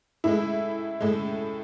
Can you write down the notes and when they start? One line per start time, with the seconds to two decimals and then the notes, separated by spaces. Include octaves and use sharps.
0.24 A2 G#3 E4
1.00 A2 G#3